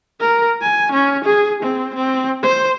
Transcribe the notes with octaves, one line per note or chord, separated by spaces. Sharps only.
A#4
G#5
C#4
G#4
C4
C4
C5